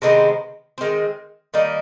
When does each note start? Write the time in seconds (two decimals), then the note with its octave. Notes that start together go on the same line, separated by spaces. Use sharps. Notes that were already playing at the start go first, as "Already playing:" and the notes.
0.02 C3 D#3 G#3 B3
0.78 D#3 G#3 C4
1.54 D#3 G3 A#3 D#4